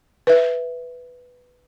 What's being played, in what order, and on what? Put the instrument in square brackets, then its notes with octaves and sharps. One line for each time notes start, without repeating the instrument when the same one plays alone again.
[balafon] B4 E5